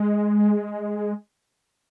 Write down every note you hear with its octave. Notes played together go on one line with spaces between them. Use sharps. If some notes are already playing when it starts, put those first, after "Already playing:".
Already playing: G#3